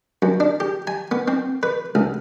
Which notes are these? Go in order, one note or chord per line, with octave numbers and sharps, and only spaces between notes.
F#2
D4
G4
G#5
B3
C4
B4
C#2